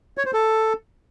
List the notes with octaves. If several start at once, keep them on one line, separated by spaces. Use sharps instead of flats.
C#5
C5
A4